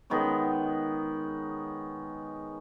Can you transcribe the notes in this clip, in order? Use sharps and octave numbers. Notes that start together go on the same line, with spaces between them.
D#3 G#3 B3 C#4